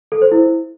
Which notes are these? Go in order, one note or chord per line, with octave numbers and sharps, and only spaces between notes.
A4
C5
E4